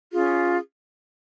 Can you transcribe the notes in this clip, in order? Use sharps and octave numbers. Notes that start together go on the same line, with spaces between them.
C#4 F4 G#4